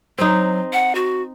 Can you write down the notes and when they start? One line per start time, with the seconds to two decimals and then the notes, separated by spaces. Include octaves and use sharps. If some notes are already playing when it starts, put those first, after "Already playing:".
0.18 F#3 C4 D#4
0.73 F#5
0.95 F#4